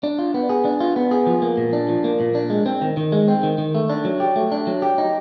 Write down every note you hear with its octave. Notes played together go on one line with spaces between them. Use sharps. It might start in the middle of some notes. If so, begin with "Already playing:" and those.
D4
F4
B3
G#4
D4
F4
B3
G#4
F3
A#3
A#2
D4
F3
A#3
A#2
D4
G#3
C4
D#3
D#3
G#3
C4
D#3
D#3
A3
D4
F#3
G4
A3
D4
F#3
G4
D#4